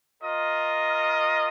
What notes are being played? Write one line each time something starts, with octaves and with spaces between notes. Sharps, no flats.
F4 A#4 D#5